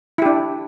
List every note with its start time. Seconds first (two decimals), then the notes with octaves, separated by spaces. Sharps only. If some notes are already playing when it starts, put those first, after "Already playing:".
0.18 E4
0.22 G4
0.26 D4